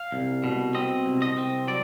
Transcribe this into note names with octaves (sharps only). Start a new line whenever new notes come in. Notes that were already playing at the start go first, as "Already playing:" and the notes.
Already playing: F5
C2
B2
C4 D#5
C2
D#5
C4
F#3 D5